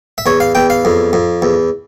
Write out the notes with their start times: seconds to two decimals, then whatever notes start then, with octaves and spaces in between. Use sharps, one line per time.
0.18 E5
0.26 E2 C#5
0.40 F5
0.55 E2 G5
0.70 F5
0.85 F2
1.13 F2
1.42 E2